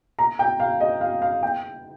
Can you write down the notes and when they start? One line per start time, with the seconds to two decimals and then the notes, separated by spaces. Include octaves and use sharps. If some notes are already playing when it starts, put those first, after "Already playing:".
0.19 A#5
0.39 G5
0.60 F5
0.80 D#5
1.01 F5
1.22 F5
1.43 G5